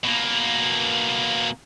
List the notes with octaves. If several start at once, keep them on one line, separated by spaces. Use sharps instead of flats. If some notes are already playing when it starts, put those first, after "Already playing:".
B2 A#3